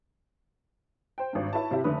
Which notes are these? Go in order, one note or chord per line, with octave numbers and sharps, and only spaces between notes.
C5 G5
G#1 G2
E4 B4 C#5 A5
C3 E4 G4
F1 D3 A3 B4 D#6